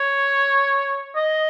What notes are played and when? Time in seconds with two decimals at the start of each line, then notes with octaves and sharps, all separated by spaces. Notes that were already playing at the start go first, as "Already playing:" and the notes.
Already playing: C#5
1.16 D#5